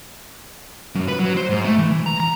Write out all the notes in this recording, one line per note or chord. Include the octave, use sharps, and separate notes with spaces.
F#2
B4
F#3
C5
G#2
A3
E3
E3
A#5
A#5